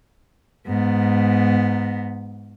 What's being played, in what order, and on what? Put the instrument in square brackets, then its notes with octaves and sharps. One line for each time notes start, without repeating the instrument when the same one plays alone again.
[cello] G#2 B3